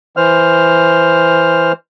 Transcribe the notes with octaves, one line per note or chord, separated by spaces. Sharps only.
E3 C5 F6